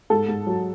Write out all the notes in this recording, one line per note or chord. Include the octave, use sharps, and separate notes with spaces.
G#2 A4
G#2
F#3